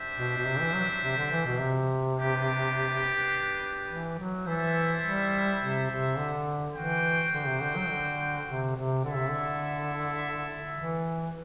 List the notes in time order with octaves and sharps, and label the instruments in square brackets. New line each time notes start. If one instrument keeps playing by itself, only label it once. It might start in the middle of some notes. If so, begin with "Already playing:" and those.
Already playing: [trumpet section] D4 G4 C5 E5
[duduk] B2
B2
C3
E3
F#3
C3
D3
E3
B2
C3
[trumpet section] B3 D4 G4 B4
[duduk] E3
F#3
[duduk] E3 [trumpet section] E4 A4 C5 E5
[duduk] G3
C3
C3
D3
[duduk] E3 [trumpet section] F#4 C5 G5
[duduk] D3
C3
D3
F#3
D3
C3
C3
[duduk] D3 [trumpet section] E4 A4 E5
[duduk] C3
D3
E3